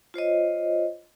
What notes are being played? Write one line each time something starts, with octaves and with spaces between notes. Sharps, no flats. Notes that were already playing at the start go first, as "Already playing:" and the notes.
F4 C5 C#5 D#5